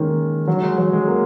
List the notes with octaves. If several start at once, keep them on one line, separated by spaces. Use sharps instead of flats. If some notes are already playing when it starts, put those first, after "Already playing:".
Already playing: D#3 G#3 A#3 C#4
F#3
G#3
F#3
G#3
A#3